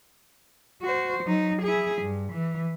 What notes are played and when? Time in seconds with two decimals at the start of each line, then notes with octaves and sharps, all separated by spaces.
0.82 F#4 C5
1.23 F#3 D#4
1.62 E4 G#4
2.01 G2
2.32 E3